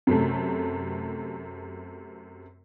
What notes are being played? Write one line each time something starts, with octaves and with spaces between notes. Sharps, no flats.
F#2 C3 A3